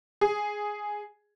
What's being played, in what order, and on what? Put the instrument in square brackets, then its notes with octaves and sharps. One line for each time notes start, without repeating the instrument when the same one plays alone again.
[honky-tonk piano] G#4